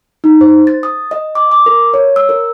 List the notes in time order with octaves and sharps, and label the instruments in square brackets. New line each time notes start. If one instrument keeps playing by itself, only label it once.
[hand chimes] D#4
C5
A6
D#6
D#5
D6
D6
A#4
C#5
E6
A#4